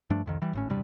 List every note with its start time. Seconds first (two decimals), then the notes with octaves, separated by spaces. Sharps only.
0.10 G2 F3 A3 D4
0.26 C2 F2 D#3
0.42 E3 G3
0.53 G#1 A2 C#4
0.69 E1 G2 C3 G3